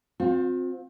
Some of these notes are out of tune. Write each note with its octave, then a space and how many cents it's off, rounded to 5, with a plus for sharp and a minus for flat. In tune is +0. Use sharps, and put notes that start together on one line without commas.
C4 +0 F4 +45